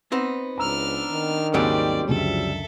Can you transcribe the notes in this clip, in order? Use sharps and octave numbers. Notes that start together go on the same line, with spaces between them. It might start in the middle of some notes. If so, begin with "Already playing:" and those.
B3 C4 D#4
C#2 D4 A#5 E6 F6
D#3
G#1 D#2 C#3 F#3 G3 C4 D5 D7
C#2 F#2 D3 F3 A4 E5